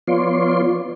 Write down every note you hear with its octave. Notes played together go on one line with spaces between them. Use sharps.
F3 B3 F4 C#5 D5 C6